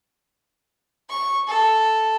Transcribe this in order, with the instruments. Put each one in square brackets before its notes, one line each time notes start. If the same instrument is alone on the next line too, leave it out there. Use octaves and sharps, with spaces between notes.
[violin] C#6
A4